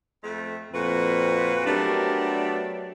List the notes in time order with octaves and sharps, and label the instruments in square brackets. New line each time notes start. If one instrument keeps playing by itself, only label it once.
[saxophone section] F2 A3
[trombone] F2 [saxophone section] A#2 F#4 B4
[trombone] F#3 [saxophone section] A3 B3 D4 [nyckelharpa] G4 A#4